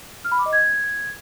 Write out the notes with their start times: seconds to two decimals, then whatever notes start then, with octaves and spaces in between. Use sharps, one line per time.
0.25 F6
0.32 B5
0.39 D6
0.46 D#5
0.53 G#6